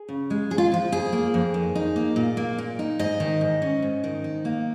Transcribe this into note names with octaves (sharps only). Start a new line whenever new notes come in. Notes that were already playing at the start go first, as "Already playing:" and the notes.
Already playing: G#4
C#3
G#3
F2 G#4
F4
F3 F4
F2 G#4
A#3
F2
D#3
D#4
A#3
A#2
A#3
A#2
D#4
G#2 D#5
D#3
G#2
C#4
G#2
D#3
D#4
A#3